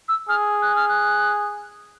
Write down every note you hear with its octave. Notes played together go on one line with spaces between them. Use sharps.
E6
G#4 F6
F#6
F6
F#6